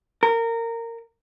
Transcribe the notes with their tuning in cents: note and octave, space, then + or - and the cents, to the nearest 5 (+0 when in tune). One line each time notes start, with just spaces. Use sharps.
A#4 -20